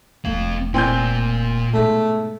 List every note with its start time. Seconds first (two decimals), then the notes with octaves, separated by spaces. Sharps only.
0.25 E1 A3 C4 F5
0.74 A#2 C4 A#4 G#5 G6
1.74 G#2 B2 A3